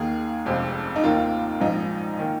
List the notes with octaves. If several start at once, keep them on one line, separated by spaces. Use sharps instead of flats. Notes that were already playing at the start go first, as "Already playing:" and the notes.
Already playing: D#2 D#3 A#3 G#4
F1 F2 C3 G#3
D#4
D#2 D#3 A#3 F4
A#1 G#2 F3 D#4
D#3 A#3